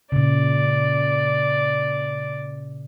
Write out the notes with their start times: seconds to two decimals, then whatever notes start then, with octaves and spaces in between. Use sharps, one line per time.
0.12 A#2 C#3 D5